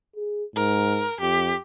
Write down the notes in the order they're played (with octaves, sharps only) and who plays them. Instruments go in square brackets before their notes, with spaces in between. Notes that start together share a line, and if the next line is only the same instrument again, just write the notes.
[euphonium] G#4
[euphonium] G#2 [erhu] A#4
[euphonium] F2 [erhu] G4